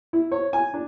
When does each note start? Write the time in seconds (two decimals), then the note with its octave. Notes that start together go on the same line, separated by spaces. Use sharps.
0.13 E4
0.32 C#5
0.53 G#5
0.74 D4